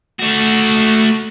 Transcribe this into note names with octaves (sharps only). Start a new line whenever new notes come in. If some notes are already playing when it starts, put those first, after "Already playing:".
A3 F#4